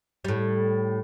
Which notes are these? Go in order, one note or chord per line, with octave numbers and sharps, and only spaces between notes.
A2 G3